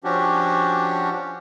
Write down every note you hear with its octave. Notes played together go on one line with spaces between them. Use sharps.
F3 C#4 D4 F#4 G4